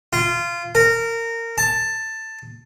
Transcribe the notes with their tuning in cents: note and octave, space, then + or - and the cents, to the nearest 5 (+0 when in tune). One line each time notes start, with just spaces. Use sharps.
F4 -20
A#4 -20
A5 +10